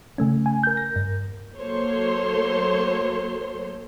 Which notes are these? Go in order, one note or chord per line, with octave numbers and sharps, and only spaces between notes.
C#3 A3 C#4
G#5
A#4 G6
A#6
G2
F#3 A#3 A4 C5 C#5 C6